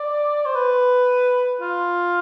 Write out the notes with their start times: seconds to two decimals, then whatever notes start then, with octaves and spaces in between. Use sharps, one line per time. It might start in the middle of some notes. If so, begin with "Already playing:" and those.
Already playing: D5
0.46 C5
0.55 B4
1.61 F4